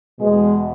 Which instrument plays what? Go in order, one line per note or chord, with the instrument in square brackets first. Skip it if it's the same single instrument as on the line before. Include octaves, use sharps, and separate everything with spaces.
[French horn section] E2 B2 G#3